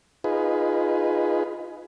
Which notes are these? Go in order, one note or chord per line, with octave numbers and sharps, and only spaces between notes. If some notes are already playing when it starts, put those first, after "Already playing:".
D#4 F4 G#4 B4